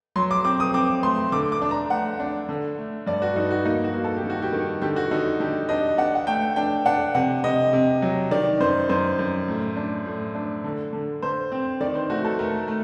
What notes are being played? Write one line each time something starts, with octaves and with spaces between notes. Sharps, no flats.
F#3 C6
D6
C4 D6
D#6
C4 D6
A3 C6
D3 D6
D6
D4
A#5
A3 F#5
D4
D3
A3
G2 D5
F#4
G2 D#4
F#4
A#3 D#4
F#4
A#3
A4
G4
D#3
F#4
G4
D#3
D3 G4
F#4
D3 D#4
D3 G4
D4 D#5
D4 F#5
F#5
A3 G5
D4 G5
D4 F#5
C3 F#5
C3 D#5
C3
F#3
D#3 D5
F#2 C5
F#2 C5
F#2
A2
D4
A2
D4
D3
D3
D3 C5
C4
D#3 D5
C5
A3 F#4
A4
A3 A#4
A3